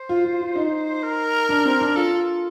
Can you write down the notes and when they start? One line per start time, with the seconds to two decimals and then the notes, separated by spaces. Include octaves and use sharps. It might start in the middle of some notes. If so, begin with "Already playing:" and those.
Already playing: C5
0.09 F4
0.25 F4
0.41 F4
0.56 D#4
1.03 A#4
1.49 D4
1.65 C4
1.81 D4
1.96 F4 A4